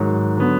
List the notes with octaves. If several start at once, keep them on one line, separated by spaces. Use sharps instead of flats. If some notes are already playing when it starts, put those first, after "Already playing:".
Already playing: G#2 D#3 F#3
D3 F#3 B3